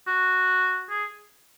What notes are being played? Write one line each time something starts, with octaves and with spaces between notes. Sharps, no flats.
F#4
G#4